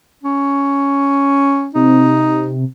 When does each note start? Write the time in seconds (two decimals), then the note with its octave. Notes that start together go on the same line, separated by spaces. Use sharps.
0.24 C#4
1.75 C3 D#4